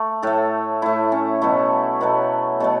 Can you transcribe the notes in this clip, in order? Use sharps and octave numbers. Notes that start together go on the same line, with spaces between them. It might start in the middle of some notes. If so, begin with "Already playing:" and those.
Already playing: A3
A2 A3 A4
A2 A3 E4
C#4
B2 F#3 A3 E4
B2 F#3 A3 B4
B2 F#3 A3 A4